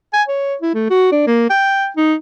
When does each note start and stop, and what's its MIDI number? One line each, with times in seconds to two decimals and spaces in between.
0.13 0.23 80
0.28 0.55 73
0.61 0.72 64
0.74 0.89 57
0.90 1.11 66
1.11 1.26 62
1.27 1.48 58
1.50 1.88 79
1.96 2.14 63